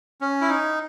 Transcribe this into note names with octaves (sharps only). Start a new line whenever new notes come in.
C#4
E4
D#4